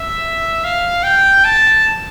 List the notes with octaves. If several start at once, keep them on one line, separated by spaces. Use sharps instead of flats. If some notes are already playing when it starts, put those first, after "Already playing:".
Already playing: E5
F5
G5
A5